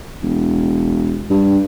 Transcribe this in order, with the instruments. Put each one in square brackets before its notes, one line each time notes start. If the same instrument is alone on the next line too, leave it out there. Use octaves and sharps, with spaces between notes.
[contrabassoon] E1
G2